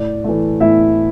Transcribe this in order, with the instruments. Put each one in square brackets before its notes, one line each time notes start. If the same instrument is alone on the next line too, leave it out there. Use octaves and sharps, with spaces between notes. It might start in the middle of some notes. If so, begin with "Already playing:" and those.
Already playing: [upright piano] A2 D5
E3 A3
A2 E4 E5